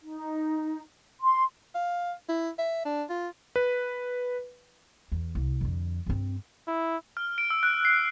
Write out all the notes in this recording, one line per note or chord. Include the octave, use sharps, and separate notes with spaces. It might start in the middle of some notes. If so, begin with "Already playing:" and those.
D#4
C6
F5
E4
E5
D4
F4
B4
E2
C2
F2 D3
G2 C4
E4
F6
D7
E6
F#6
C7